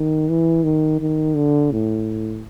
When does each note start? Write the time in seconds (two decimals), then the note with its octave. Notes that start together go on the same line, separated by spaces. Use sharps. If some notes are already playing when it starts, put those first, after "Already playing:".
Already playing: D#3
0.29 E3
0.64 D#3
1.00 D#3
1.36 D3
1.72 A2